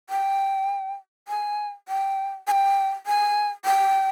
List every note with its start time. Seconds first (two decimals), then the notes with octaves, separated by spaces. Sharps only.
0.10 G5
1.28 G#5
1.88 G5
2.47 G#5
2.52 G5
3.06 G#5
3.65 G5